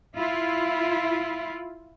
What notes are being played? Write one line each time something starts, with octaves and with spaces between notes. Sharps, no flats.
E4 F4